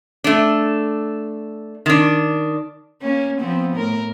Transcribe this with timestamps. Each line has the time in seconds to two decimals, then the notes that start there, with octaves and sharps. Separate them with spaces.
0.24 A3 D4
1.86 D#3 D4
3.02 A#3 C#4
3.40 F3 B3 C4
3.74 A2 A#4